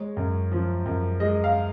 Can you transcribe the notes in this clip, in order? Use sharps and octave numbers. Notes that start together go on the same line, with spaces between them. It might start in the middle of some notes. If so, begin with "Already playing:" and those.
Already playing: G#3 C#5
F#2
F3
F#2
G#3 D#5
F5